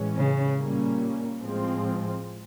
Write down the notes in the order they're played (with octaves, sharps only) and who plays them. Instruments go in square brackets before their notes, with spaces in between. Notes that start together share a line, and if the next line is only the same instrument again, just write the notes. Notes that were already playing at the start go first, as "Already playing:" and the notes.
Already playing: [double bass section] A2 E3 G#3 C#4
[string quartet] C#3
[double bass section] A#2 G3 A#3 C#4
A2 F3 G#3 C4